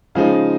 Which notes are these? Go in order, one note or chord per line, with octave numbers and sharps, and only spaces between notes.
C#3 F3 G#3 D#4 F5